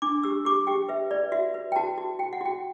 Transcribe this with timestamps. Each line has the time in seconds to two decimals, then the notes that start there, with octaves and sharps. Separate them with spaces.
0.02 D4 D6
0.23 G4 E6
0.45 G4 D6
0.67 G4 G5
0.88 B4 E5
1.11 B4 D5
1.32 F#4 E5
1.54 B4
1.72 G5
1.76 F#4 A5
1.98 F#4
2.19 F#4 G5
2.33 F#5
2.41 F#4 G5